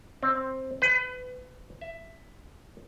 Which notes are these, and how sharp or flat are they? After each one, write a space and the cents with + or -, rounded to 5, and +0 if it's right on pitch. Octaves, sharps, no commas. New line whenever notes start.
C4 +10
B4 +30
E5 +10